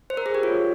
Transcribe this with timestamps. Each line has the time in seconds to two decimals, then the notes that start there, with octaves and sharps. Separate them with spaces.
0.10 C5
0.17 A#4
0.26 G#4
0.35 G4
0.43 F4 C#5